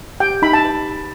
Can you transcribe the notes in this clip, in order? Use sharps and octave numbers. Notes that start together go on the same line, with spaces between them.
G4 G5
D#4 B5
A5
B4